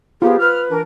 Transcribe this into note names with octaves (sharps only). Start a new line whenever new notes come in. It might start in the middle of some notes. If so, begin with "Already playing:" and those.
B3 F4 G4 G#4
B4 F6
E3 D4 A#4